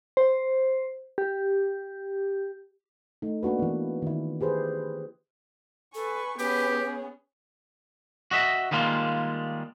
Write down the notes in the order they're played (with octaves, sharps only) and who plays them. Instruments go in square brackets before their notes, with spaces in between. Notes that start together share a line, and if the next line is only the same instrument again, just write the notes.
[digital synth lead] C5
G4
[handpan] A3 D#4
A#3 D4 F#4 B4
E3 B3
D#3 E4
G4 G#4 B4 C5
[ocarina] A4 [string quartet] B4 G#5 C#6
[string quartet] B3 C#4 G#4 [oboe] G4 [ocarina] B4
[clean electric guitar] F#4 D#5 E5
D#3 G3 G#3 A#3 F4